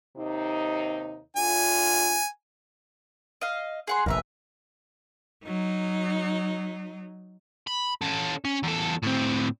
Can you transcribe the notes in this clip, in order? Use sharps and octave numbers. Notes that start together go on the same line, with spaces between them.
D#2 C3 D#4
D3 D4 F4 G#5
D#5 F5
G#4 F#5 C6
F1 A#1 D#2 A#4 B4 E5
F#3 D#4
B5
C#4 A4
C#4
E2 A4
A2 C4